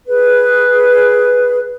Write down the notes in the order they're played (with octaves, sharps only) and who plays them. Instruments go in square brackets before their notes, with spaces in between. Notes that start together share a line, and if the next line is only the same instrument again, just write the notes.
[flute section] G#4 B4